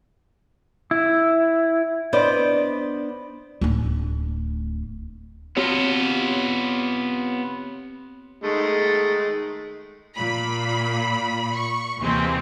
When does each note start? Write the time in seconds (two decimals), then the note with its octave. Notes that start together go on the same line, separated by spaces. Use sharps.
0.91 E4
2.13 B3 D4 C5 D5 D#5
3.61 D1 D4
5.56 B3 C4 F4 G4 C#5
8.43 D#3 G#3 A3
10.16 A#2 B5
11.55 C#6
11.99 D#2 C3 E3 G#3 A#3 C4